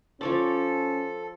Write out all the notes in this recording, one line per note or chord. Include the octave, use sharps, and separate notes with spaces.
F3 C#4 A4 C#5 D5